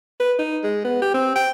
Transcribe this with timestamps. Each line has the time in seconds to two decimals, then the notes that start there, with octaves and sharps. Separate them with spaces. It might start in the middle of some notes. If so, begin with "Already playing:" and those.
0.20 B4
0.39 D#4
0.64 G#3
0.84 B3
1.02 G4
1.14 C4
1.36 G5